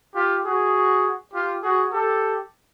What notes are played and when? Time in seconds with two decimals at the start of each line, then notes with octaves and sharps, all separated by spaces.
0.15 F4 G4
0.45 F#4 G#4
1.34 F4 G4
1.63 F#4 G#4
1.93 G4 A4